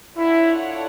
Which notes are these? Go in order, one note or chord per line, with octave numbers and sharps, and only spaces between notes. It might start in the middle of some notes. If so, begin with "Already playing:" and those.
D4 E4 F4 A4 C#5 F#5